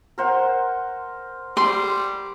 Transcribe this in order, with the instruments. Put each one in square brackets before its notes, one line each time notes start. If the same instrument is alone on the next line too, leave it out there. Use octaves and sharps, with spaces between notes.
[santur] A#4 C5 F#5
[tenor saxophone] G3 [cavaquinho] C6